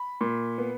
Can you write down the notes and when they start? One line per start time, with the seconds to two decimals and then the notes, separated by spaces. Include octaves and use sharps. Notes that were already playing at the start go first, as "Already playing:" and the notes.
Already playing: B5
0.21 A#2
0.58 B3